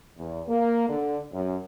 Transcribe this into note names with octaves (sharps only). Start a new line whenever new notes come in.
E2
A#3
D3
F#2